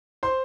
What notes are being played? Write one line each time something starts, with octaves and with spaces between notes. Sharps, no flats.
C5 C6